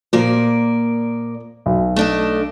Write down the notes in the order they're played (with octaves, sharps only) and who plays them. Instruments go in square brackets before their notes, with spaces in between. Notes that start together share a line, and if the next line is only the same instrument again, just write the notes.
[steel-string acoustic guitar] A#2 A#3 D5 [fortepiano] F3
[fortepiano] B1
[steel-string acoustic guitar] A3 D4 D#5